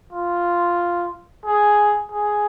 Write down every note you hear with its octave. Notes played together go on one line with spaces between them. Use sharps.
F4
G#4
G#4